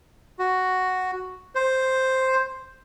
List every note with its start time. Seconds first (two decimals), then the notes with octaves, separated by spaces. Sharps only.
0.39 F#4
1.55 C5